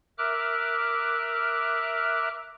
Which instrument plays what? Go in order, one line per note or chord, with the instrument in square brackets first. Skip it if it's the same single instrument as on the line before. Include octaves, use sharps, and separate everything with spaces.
[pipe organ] A#4 E5 D6 F6 F#6